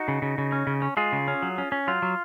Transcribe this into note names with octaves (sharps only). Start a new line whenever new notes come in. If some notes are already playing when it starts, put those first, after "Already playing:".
Already playing: D#4 F#4
C#3
C#3
C#3
C#4
C#3
C#4
G#3 F4 G#4
C#3
C#4
F#3
C#4
C#4
F#3 F4
F#3